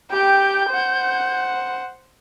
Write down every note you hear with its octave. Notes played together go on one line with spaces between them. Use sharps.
G4 G5 G6
C5 F#5